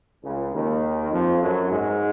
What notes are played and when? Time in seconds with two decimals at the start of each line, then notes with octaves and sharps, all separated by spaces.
0.23 C#2 C#3
0.53 D#2 D#3
1.11 F2 F3
1.41 F#2 F#3
1.70 G#2 G#3